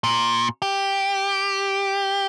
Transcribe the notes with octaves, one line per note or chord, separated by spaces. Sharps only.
A#2
G4